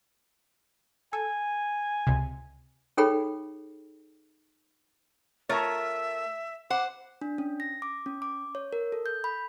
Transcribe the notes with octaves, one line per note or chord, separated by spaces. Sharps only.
A4 G#5
C#2 C3
D#4 G#4 A4 C#5 G5 B5
A3 F4 A#4 C#5 E5 A#5
C5 F#5 D6
D4
C#4
A#6
D6
C#4
D6
C#5
A#4
A4
G6
B5